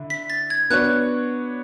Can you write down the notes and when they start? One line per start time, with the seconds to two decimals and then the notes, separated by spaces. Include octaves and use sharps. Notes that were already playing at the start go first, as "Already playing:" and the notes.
Already playing: D3 E4
0.10 B6
0.30 A6
0.50 G#6
0.70 B3 D4 F#4 C#5 F#6